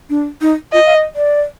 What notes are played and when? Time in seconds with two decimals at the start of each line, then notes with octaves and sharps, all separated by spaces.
0.10 D4
0.41 D#4
0.73 F4 D#5
0.86 F5
0.95 D#5
1.16 D5